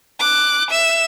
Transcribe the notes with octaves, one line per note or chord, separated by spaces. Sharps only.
D6 F#6
E5 E7